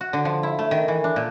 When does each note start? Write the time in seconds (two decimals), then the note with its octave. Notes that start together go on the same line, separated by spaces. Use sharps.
0.01 F#4
0.13 D3
0.25 F3
0.43 E4
0.59 A3
0.71 D#3
0.88 E3
1.04 D4
1.16 A#2